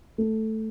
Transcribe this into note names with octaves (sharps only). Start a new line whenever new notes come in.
A3